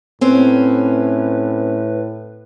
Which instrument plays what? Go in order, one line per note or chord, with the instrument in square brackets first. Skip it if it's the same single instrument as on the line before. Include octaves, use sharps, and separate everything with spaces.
[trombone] A2 [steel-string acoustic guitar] C4 C#4 [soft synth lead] B4